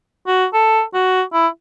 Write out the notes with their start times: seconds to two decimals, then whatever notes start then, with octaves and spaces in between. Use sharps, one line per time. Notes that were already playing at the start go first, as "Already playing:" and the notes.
0.27 F#4
0.54 A4
0.94 F#4
1.33 E4